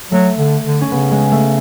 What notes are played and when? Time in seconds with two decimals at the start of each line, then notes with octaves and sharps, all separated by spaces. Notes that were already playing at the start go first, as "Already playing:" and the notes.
0.11 F#3 A3
0.39 D3
0.65 D3
0.81 C#4
0.91 C#3 B3
1.12 G#3
1.32 A3